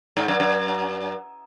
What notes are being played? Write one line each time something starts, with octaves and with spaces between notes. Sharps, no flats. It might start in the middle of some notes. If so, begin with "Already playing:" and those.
G#2
F#2
F#2